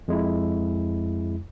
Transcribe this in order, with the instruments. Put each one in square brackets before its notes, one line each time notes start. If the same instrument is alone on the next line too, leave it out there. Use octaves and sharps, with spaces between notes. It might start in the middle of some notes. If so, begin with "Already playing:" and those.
[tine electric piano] F2 G#3 E4